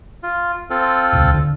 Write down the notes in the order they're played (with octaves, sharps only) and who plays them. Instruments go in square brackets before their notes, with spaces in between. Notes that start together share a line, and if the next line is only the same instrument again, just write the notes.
[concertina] F4
C4 F4 A4
[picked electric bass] D#1 C#2
D3